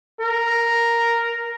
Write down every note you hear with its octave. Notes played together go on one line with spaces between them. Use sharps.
A#4